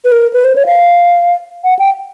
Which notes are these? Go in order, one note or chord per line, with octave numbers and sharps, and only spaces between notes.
B4
A#4
B4
C5
C#5
F5
F#5
G5